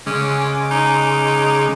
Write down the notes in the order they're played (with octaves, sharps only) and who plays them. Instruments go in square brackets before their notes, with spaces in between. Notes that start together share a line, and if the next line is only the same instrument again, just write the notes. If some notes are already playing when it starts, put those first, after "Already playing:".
[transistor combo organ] C#3 G#3 D6 [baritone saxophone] C#4
[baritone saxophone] D#4